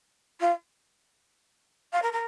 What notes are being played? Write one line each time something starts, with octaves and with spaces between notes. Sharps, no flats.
F4
F5
A#4
A#4